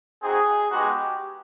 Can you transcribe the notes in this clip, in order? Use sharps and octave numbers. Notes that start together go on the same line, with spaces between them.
C4 D#4 F#4 G#4
G#3 B3 D#4 F#4 G4